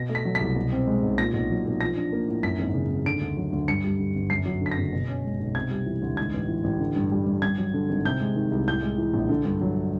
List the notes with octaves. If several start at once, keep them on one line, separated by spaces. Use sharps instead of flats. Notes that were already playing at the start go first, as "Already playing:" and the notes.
Already playing: B2 A#6
A3
B6
F#3
B6
C2
B2
C4
G#3
B1
A#2 A#6
B1
F#3
B1
F3 A#6
D4
A#3
A2
F#2 B6
G#1
C#3
G#1
D3 D7
D2
F#3
D2
G2 C#7
G3
D3
G1
F#2 C7
F#3
D3 B6
A#6
F#1
B2
C#4
G#3
B1
C3 G#6
G3
E3
D2
G#2 G#6
A1
E3
A1
D3
G2
G3
G2
G2 G#6
F#3
D3
G#1
C3 G6
G#3
D#3
C2
A2 G6
G#3
E3
A#1
D3
G2
F#3